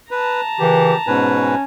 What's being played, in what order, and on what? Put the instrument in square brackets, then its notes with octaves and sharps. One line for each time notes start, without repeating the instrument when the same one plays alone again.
[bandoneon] B4 [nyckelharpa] A5 A#5
[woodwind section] A#2 C#3 E3 [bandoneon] G4
[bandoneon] G#2 B2 B4 [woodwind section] C#4 G#5